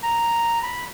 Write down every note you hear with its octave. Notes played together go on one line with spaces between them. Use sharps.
A#5
B5